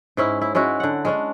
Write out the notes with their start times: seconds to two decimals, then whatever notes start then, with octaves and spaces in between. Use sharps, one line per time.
0.17 G#2 C#4 E4
0.42 E4
0.55 G#3 C#4 E4 F#4
0.80 D3 F#5
1.05 G#3 C#4 D4